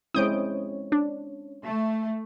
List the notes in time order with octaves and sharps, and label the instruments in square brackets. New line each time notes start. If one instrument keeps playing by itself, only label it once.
[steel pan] G#3 C4 E4 [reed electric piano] C#4 C#5 [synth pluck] D#6 G6 D7
[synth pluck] D4
[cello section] A3